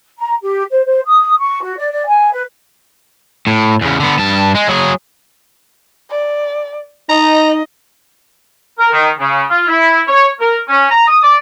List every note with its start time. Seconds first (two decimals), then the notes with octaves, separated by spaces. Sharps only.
0.18 A#5
0.42 G4
0.71 C5
0.87 C5
1.06 D#6
1.38 C#6
1.62 F#4
1.77 D5
1.91 D5
2.07 G#5
2.31 B4
3.47 A2
3.81 E2 C#3
4.00 D3 B3
4.19 G2 A5
4.55 G#3
4.68 F#3 G#4
6.10 D5
7.09 D#4 D#5 A#5
8.79 A#4
8.92 D#3
9.19 C#3
9.50 F4
9.67 E4
10.08 C#5
10.40 A#4
10.68 C#4
10.90 A#5
11.07 D#6
11.23 D5